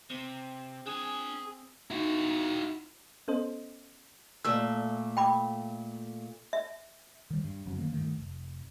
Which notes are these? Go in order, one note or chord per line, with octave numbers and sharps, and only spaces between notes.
C3 C4
D4 G#4 G#5
D#4 E4 F#4
B3 C#4 A4 C5 D#5
A#2 A3 E6
G5 B5 D6
E5
D#3 G3
G2
F#1 F2 F#3 C#4
D3 D#3 G#3 A#3
G2 D#3 A3
F1